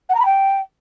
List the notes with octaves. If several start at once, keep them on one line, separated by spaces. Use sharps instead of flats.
F#5
A#5
B5
G5